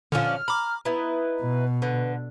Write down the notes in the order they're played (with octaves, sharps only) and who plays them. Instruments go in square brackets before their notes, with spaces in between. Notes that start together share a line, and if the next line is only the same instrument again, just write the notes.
[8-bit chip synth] A#2 D3 [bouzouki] F3 C#4 D4 [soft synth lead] F6
[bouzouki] A#5 [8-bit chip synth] B5 D6
[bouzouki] B3 D#4 E4 [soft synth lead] B4
[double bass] B2
[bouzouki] D3 [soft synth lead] B4